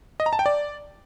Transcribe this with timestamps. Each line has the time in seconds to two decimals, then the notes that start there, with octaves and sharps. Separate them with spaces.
0.20 D#5
0.26 A#5
0.33 A5
0.39 G5
0.46 D5